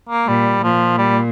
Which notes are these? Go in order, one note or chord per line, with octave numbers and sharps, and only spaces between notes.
A#3
A#2 G3
A#2 F3
G3